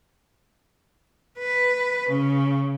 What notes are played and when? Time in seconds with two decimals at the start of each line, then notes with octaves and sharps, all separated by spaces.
1.38 B4
2.10 C#3